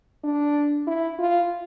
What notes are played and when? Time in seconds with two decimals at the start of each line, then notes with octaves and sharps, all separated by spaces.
0.24 D4
0.87 E4
1.19 F4